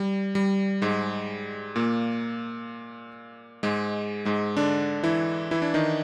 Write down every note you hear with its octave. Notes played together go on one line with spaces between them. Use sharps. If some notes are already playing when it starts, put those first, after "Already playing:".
Already playing: G3
G3
G#2 G#3
A#2 A#3
G#2 G#3
G#2 G#3
D3 D4
E3 E4
E3 E4
D4
D#3 D#4